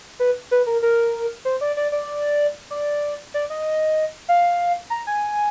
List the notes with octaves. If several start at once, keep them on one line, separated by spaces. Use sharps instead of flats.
B4
B4
A#4
A#4
C5
D5
D5
D5
D5
D5
D#5
F5
A#5
G#5